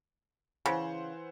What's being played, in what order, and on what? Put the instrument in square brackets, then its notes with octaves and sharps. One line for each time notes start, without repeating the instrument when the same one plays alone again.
[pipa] C#3 [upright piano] E3 C5 F#5